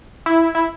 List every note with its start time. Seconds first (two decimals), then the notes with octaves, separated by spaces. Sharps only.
0.26 E4
0.55 E4